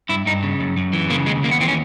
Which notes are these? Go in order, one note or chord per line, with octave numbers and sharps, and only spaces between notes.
G2 E4
G2 D#4
C#3
F#2
F#2
E3
C#3 A#3
D#2 G#3
D#2 A#3
B3
E3 C4
C#4